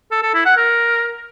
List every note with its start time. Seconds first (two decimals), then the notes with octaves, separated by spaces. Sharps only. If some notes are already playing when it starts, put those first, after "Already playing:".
0.11 A4
0.23 A4
0.34 E4
0.46 F#5
0.57 A#4